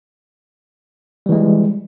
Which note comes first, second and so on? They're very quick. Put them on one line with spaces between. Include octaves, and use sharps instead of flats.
G3 E3 G#3